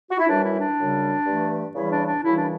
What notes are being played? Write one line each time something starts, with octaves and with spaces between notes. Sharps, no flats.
F#4
E4
F#2 E3 G3 D4
E4
D4
F#2 C#3 G3
G2 E3 A3
E2 C#3 E3 G3 E4
D4
D4
F#2 C#3 E3 G3 E4
D4